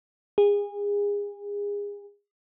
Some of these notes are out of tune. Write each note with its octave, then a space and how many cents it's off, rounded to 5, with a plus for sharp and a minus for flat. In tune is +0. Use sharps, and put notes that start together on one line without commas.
G#4 -30